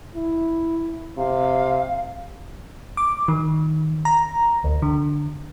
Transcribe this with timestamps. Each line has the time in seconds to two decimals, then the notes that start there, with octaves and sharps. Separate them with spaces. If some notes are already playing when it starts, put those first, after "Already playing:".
0.15 E4
1.18 C3 F5
2.97 D6
3.28 D#3
4.05 A#5
4.64 D2
4.82 D3